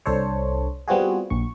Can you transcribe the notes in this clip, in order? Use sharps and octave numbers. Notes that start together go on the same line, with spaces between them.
C2 D4 A4 C5 C#5
G3 B3 C4 F4 F#4 G#4
A#1 C#6